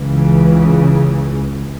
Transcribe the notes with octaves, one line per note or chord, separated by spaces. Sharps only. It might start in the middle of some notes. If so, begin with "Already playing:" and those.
Already playing: C#2 C#3 E3